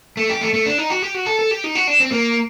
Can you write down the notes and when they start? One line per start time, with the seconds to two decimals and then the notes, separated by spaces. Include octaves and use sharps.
0.17 A3
0.30 G4
0.41 A3
0.54 A3
0.66 D4
0.78 D#4
0.90 F#4
1.02 G4
1.14 F#4
1.26 A4
1.39 A4
1.51 G4
1.64 D#4
1.75 F#4
1.87 D4
2.00 C4
2.12 A#3